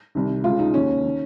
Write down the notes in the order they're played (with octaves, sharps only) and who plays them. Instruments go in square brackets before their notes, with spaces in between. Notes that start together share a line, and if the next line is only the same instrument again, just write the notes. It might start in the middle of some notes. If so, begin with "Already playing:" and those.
[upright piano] C2 C3 D#3
C#2 C#3 F4
D#4
D#2 D#3 C#4
D#3